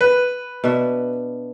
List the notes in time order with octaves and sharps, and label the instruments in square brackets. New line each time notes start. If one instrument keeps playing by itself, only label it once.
[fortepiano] B4
[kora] B2 D4 E5